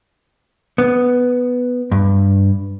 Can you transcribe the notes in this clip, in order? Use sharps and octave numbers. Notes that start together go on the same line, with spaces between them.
B3
G2